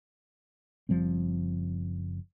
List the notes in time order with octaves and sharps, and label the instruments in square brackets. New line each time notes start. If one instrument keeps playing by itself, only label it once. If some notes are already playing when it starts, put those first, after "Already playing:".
[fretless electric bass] F#1 F3 G3 C4